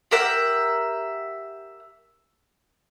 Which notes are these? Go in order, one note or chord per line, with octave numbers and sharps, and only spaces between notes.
G4 A#4 E5 F#5